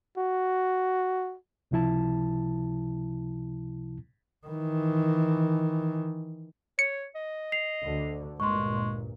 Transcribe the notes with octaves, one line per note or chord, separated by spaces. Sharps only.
F#4
C#2 C3 F3 E4 A5
D#3 E3
C#5 C#7
D#5
C7 F7
D2 D3
G1 A#2 G#3 C6 C#6